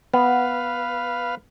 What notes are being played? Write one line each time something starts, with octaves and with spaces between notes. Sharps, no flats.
B3 B4 F5